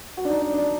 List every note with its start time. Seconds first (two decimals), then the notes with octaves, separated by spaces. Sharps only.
0.17 F#4
0.25 D4
0.30 D#4
0.41 D4
0.54 D4